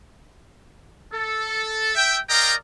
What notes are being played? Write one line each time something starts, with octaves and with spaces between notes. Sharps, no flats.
A4
E5 G5
A#4 D5 D#5 F5 G5 A#5